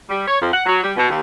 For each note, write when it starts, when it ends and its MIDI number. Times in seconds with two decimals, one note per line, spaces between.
0.10 0.26 55
0.27 0.40 73
0.41 0.49 41
0.53 0.62 78
0.66 0.80 54
0.83 0.92 55
0.97 1.07 47
1.09 1.20 39